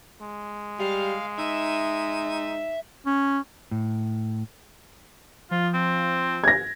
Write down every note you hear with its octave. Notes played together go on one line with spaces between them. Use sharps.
G#3
G3 F5
D#4 E5
C#4
A2
F3 F4
C4
G#6 A#6